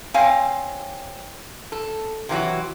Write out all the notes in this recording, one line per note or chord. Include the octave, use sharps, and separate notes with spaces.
C4 C5 C#5 F5 G#5
A4
C3 E3 F#3 F#4